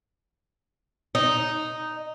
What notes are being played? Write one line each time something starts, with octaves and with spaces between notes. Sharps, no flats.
D#4